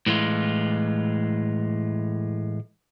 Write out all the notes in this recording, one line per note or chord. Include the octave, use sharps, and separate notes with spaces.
A2 E3 G#3 F4